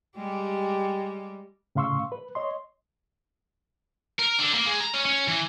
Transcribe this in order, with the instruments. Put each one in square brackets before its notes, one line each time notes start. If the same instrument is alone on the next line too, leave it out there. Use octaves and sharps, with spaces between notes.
[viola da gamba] G3 G#3 G4
[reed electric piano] A2 C#3 F5 C6 C#6 E6
B4
C#5 D#5 C6
[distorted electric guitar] A#4
D3
A#3
G#3
A#5
C#4
C#4
E3